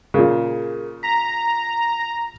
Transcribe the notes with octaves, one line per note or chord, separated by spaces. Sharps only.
A#2 C#3 G#4 A#4
A#5 B6